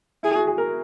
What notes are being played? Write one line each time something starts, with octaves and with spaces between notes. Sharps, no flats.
E4 G#4
F#4
G#4
A#4